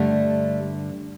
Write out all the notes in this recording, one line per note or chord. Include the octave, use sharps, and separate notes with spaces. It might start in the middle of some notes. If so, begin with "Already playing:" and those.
Already playing: G2 D3 G3 A3